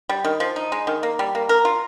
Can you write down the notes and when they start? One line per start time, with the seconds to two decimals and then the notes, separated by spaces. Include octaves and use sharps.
0.09 G3
0.24 D#3
0.40 F3
0.56 D#4
0.72 G#3
0.87 D#3
1.03 A#3
1.19 G3
1.35 A#3
1.49 A#4
1.65 F4